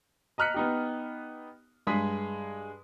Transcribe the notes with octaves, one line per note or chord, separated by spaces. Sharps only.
D#5 A#5 F6 F#6 B6 C#7
B3 D#4 G4
G2 G#3 G#4 B6